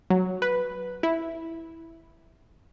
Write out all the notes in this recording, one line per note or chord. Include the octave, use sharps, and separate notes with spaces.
F#3
B4
E4